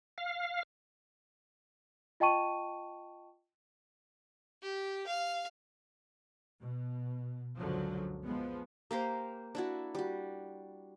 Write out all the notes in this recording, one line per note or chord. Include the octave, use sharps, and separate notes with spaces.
F5
F4 D#5 G5 A5 C#6 D#7
G4
F5
B2
C#2 F#2 D3 F3 F#3
F3 G#3 B3
A#3 G4 A#4 C5
D4 E4 F#4
G3 F#4